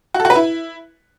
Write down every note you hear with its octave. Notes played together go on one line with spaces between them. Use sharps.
F#4
A4
F#4
B4
E4